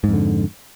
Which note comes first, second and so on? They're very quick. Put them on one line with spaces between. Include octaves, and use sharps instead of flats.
G#2 F2 D3